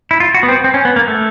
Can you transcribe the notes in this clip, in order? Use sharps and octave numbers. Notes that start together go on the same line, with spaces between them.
E4
F4
F#4
B3
C4
C4
C#4
B3
A#3
A3